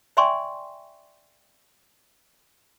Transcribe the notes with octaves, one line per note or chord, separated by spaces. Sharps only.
D5 E5 G5 G#5 C6 C#6